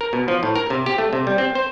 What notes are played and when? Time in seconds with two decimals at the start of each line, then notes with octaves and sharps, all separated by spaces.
0.01 A#4
0.13 B2
0.28 F3
0.43 A2
0.55 A#4
0.70 C3
0.86 G4
0.98 A3
1.13 C3
1.27 G3
1.38 C4
1.55 C5